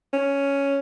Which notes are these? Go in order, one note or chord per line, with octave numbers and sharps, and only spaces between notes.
C#4